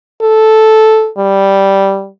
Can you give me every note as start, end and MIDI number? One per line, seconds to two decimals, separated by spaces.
0.22 1.10 69
1.18 2.09 55